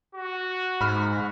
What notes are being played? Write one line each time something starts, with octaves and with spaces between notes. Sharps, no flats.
F#4
G#2 B5 F6